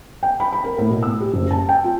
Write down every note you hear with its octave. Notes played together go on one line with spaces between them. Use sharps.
G5
B5
B5
A#4
A2
B2
E6
G4
F#1
A5
G5
F4